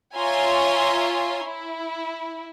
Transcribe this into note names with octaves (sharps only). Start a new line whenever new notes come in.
F4 C#5 E5 G#5 A#5 C6
E4